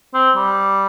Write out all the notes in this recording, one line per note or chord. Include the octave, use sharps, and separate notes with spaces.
C4
G3